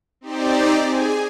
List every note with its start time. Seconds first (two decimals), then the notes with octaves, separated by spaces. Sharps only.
0.21 C4 D#4 G4 C5 D5
0.84 G#4 G#5